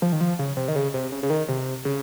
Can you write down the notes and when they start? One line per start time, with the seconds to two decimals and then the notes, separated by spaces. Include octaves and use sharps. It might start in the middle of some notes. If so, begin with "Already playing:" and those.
0.02 F3
0.12 D#3
0.21 F3
0.39 C#3
0.57 C3
0.68 D#3
0.76 C#3
0.94 C3
1.12 C#3
1.23 C#3
1.30 D#3
1.49 C3
1.85 C#3